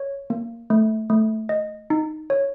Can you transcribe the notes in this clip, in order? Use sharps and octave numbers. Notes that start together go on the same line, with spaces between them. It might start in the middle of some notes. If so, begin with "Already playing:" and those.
Already playing: C#5
A#3
A3
A3
D#5
D#4
C#5